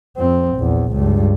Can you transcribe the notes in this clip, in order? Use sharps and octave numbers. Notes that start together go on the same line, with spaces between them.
F2 C4
A#1 E2
C#2 G2